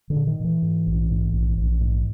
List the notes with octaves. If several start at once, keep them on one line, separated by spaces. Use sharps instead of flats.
D3
A#2
D#3
A#2 E3
G#2
A#1
G#2
A#1
A#1
G#2